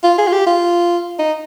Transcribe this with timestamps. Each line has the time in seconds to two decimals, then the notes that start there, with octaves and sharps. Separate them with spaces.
0.04 F4
0.18 G#4
0.27 F4
0.32 G4
0.47 F4
1.19 D#4